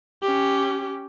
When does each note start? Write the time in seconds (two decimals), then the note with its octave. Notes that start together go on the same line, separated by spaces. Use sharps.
0.23 C#4 G4